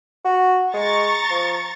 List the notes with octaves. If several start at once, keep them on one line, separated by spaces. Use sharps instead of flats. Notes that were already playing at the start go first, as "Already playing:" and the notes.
F#4
G#3 A#5 C#6 A6
F3